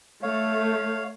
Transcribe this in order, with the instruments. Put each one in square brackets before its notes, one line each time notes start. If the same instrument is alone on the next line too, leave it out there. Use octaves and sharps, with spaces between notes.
[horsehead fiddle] A3 [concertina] C#5 F5